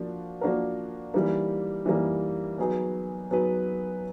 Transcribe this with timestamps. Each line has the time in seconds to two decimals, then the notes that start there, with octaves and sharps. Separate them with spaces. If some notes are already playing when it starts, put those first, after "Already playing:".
Already playing: F3 A#3 D4 F#4
0.41 F3 A#3 D4 F#4 A#4
1.14 E3 G3 A#3 D#4
1.86 E3 G3 A#3 D#4
2.58 F#3 B3 D#4 G#4 B4
3.31 F#3 B3 D#4 G#4 B4